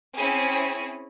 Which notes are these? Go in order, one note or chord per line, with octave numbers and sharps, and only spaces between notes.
C4 C#4 E4 G#4